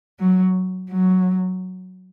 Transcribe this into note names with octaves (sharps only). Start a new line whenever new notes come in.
F#3
F#3